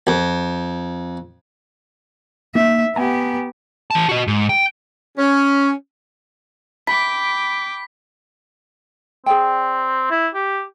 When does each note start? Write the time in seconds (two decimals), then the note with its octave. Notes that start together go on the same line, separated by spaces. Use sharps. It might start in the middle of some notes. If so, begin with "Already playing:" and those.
0.07 F2
2.55 A#3 D#4 E5
2.96 B3 G4 F#5 G#5 A#5
3.91 E3 A5
4.09 F#4 D#5
4.27 G#2
4.49 G5
5.18 C#4
6.87 G5 B5 D6 B6
9.26 C4 G#4 D5 G5
10.11 E4
10.34 G4